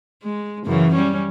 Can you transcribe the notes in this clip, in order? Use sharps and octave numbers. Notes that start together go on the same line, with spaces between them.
G#3
F#2 C#3 E3
G3 C#4